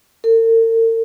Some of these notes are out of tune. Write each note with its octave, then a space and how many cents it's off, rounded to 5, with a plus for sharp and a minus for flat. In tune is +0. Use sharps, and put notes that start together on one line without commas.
A#4 -45